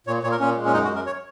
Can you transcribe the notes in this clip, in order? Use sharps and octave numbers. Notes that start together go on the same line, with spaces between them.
A#2 C#5
A#2 C#5
A#4
A#2 C#4
G#3
C#4
F#2 D#4
F#4
F#2
A#4
C#5